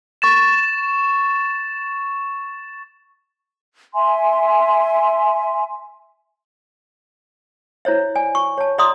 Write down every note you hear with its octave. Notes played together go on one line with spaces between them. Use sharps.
C#6 A6 E7
E5 G#5 C6
E4 C5 C#5 E5
D5 G#5
C#6
C#5 A5
D5 E5 A#5 C6 D#6